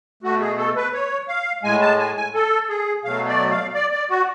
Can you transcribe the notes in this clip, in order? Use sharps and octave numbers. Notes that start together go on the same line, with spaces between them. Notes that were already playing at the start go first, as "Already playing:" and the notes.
B2 A3 F#4
G#4
A4
B4
C#5
F5
A2 G#3 G#5
A5
G#5
G#5
A4
G#4
B2 F#3 A3 F5
D5
F5
D5
D5
F#4